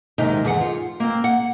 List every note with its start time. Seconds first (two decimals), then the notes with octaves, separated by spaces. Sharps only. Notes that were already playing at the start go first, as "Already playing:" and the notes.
0.18 D#2 G#2 C3 D#3 D#4
0.44 E2 G#4 F#5
0.61 F4
1.00 A#3 C4
1.24 F#5